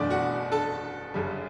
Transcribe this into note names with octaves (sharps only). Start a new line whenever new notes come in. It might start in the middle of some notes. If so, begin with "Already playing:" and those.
Already playing: F#1 E2 B2 A3 D4 D5
F#4 F#5
A4 A5
G1 F#2 C#3 G3